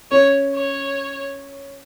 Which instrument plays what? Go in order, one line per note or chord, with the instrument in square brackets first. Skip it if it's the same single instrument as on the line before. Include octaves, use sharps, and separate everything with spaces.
[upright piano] C#4 [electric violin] C#5
[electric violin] C#5